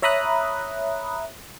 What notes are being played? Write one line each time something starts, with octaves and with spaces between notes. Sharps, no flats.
C#5 E5 A#5 B5 D#6 F#6